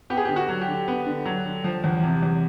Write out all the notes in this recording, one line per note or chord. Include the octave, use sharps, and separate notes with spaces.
B3 G4
G#4
D3 G4
F#4
F#3
G4
D3
B3
D3
F#3
D3
F3
E2
C3
E2